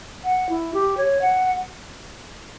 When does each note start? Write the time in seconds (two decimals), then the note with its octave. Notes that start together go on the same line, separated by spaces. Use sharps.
0.24 F#5
0.49 E4
0.74 G4
0.97 C#5
1.21 F#5